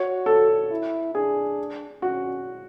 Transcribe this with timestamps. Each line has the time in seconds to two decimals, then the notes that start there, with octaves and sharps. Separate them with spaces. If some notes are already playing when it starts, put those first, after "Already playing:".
Already playing: F#4 C#5
0.26 A4
0.71 E4
1.14 D4 G#4
2.02 C#4 F#4